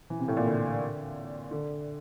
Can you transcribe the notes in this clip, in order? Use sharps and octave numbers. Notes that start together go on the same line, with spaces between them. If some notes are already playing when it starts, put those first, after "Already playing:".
E3
C3
A2
A#2
D3
D3